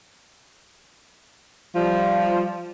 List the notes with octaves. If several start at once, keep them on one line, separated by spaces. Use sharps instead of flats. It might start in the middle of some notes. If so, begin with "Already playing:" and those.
F3 G3